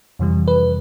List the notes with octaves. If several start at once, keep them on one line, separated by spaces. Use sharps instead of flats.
F2 C3 E3 G3
B4